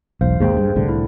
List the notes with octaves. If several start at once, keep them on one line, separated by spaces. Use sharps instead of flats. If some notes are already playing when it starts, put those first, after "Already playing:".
E1 B1 C5 F5
D#2 G#2 C3 G#4 C5 G5
G2
C2 A2 D3
E4